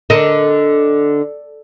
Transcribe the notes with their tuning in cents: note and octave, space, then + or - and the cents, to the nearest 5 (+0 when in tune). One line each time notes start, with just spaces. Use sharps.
D3 +0 A#4 +0 D#5 +0